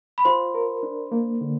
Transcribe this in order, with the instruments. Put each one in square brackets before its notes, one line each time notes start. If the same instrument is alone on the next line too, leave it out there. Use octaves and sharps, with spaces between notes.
[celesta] B5
[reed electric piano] F4 [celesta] C5 C6
[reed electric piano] A#4
D4
A#3
D3